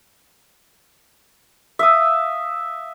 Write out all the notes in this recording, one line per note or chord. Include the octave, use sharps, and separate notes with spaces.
E5 F5 D#6